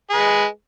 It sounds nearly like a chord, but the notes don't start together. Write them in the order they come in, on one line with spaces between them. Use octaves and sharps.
G#4 B4 G#3